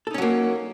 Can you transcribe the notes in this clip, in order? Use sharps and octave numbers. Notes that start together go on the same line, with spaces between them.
F#3 A#3 C#4 D#4 A4